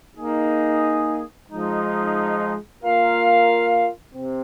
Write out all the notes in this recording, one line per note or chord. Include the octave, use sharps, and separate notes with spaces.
A#3 D#4 G#4
F3 G#3 D#4
A#3 F4 A#4 F5
C3 C4